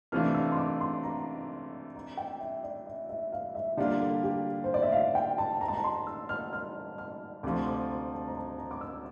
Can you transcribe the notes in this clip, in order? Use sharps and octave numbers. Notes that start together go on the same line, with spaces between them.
C3 E3 A3 D4 F4 F6
E6
C6
D6
C6
A#5
A#5
G5
E5
D5
E5
E5
F5
E5
D3 G3 A#3 D4 F4 D5
A4
G4
C5
D5
E5
F5
G5
A5
A#5
A5
A#5
C6
E6
F6
F6
F6
D2 C3 F3 D6
D6
A#5
A5
A#5
A5
A#5
D6
E6